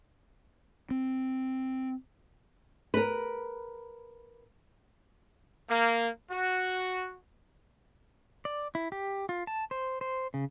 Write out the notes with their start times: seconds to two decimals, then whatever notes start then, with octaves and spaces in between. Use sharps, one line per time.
0.91 C4
2.94 A#4 B4
5.69 A#3
6.31 F#4
8.45 D5
8.75 E4
8.92 G4
9.29 F4
9.47 A5
9.71 C5
10.01 C5
10.34 C#3